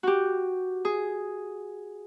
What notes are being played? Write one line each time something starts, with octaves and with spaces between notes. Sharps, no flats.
F#4 G4
G#4